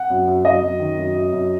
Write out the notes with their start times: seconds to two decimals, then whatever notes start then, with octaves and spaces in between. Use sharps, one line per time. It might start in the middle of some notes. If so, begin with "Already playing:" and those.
Already playing: F#5
0.10 F#2
0.27 F#2
0.44 F#2 D#5
0.62 F#2
0.79 D#3
0.98 F#2
1.15 F#2
1.33 F#2